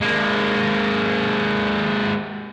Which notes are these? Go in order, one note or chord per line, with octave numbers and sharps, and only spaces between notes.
G#3 A#3